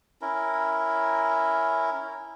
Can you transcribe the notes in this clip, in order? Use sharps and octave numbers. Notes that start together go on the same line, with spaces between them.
C#4 E4 A#4